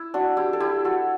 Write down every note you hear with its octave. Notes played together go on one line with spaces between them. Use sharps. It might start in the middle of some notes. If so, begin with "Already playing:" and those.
Already playing: E4
D4 F#4
E4 G4
A4
E4 G4
F#4 A4